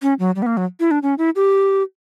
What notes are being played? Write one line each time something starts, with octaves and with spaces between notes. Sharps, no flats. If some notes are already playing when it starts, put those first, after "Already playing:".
C#4
F#3
G3
B3
A#3
F#3
E4
D4
C#4
E4
G4